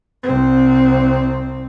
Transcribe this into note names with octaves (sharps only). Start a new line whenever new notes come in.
C2 C4